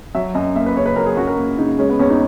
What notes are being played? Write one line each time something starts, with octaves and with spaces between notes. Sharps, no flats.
F#3 E5
F#2 D#5
A#3 E5
B4
C#3 C#5
B4
F#3 A#4
G#4
F#2 F#4
A#4
A#3
C#3 D#4
G#3 C#4
B3
E2 C#4
D#4